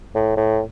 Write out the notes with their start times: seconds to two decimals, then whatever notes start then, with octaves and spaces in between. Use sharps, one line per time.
0.15 A2
0.37 A2